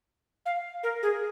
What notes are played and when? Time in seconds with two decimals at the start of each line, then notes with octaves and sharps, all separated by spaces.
0.46 F5
0.83 A#4
1.03 G#4